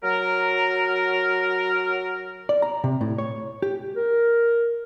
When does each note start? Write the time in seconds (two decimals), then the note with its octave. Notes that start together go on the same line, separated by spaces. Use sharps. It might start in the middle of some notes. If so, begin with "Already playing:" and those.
0.03 F#3 A#4
2.49 D5
2.62 A#5
2.84 C3
3.01 A2
3.18 C#5
3.62 G4
3.96 A#4